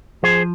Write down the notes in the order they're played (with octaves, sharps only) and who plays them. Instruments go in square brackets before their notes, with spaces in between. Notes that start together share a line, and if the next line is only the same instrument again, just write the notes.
[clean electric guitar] F3 G#4 C5